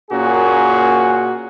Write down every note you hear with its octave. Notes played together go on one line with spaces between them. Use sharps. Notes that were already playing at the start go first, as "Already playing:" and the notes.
A#2 A#3 C#4 F#4 G#4